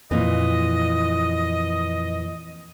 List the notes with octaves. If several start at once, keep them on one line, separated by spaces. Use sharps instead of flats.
F2 A#2 E3 D#5